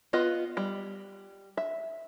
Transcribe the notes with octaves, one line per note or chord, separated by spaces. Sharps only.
B3 F4 D#5
G3
E5